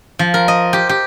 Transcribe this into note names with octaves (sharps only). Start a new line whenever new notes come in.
F3
A#4
D#5
G4
G4